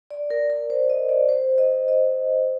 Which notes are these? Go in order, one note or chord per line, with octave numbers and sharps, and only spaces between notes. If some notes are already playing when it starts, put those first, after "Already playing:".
D5
A#4
A#4
C5
D#5
D5
C5
D#5
D#5